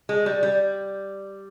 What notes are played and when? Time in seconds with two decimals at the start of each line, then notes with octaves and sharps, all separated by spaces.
0.09 G#3
0.26 G3
0.43 G3